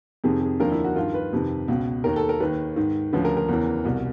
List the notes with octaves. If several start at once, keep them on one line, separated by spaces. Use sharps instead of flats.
F2 C3 D#3 G#4
G#4
D#2 D3 F3 A#4
E4
F#4
G2 D#3 F4
B4
F2 C3 D#3
C#2 B2
D#2 D#3 A#4
A4
A#4
D#2 D#3 B4
G#2 D#3
D2 C#3 F3 B4
A#4
A#4
E2 C#3 E3
C2 B2